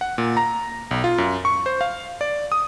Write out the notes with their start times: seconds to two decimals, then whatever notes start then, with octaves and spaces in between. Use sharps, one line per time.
0.01 F#5
0.18 A#2
0.37 A#5
0.91 B1
1.04 F4
1.18 F#2
1.45 C#6
1.66 C5
1.81 F5
2.21 D5
2.52 D#6